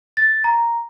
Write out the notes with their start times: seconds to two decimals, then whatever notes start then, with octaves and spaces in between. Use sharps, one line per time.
0.17 A6
0.44 A#5